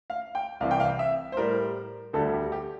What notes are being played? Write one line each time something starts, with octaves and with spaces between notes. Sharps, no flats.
F5
G5
C2 C3 E3 F5
G5
F5
E5
C5
A2 G3 A#4
D2 D3 G3 A4
G4
G4